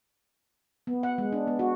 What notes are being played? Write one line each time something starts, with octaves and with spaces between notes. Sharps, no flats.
B3
F#5
G#3
D4
B3
F#4